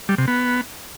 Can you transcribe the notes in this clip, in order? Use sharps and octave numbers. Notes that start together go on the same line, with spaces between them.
G3
C3
B3